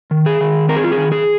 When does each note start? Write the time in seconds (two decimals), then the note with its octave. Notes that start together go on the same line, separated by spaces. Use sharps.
0.11 D#3
0.26 G#4
0.41 D#3
0.69 C4 A#4
0.76 G#4
0.84 F4
0.91 G#4
0.98 D#3
1.12 G#4